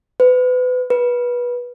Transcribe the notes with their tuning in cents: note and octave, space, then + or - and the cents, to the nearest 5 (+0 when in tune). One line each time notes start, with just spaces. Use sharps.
B4 +30
B4 -20